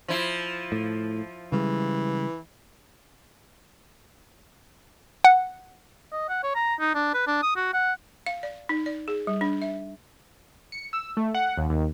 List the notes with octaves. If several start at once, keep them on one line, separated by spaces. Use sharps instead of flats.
F3 E4
A2
C#3 E3 G3 G#3
F#5
D#5
F#5
C#5
A#5
D#4
D4
B4
D4
D#6
F#4
F#5
F5
D5
D#4
D5
G#4
G3
D4
E5
C#7
E6
A3
F#5
D#2
D#2